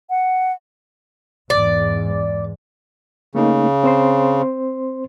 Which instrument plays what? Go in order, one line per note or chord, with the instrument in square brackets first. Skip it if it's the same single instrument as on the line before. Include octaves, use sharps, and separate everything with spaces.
[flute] F#5
[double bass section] E2 G#2 [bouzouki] D5
[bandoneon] C#3 [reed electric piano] A3 A#3 D#4
[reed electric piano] C4 C5 C6